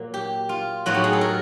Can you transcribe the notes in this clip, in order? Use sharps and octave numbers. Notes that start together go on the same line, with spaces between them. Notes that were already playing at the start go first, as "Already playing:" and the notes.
Already playing: A#2 F#3 A#3
G4
F4
A2 F#3 B3 D#4 F#4
G4
G#4
A4
A#4